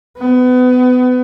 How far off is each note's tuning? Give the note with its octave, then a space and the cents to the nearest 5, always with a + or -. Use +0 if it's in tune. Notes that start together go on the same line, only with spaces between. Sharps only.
B3 +30